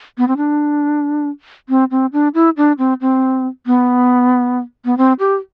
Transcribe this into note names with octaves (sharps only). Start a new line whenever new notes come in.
B3
C4
D4
C4
C4
D4
E4
D4
C4
C4
B3
B3
C4
G4